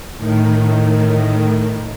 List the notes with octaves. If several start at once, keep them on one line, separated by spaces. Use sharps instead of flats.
A2 D#3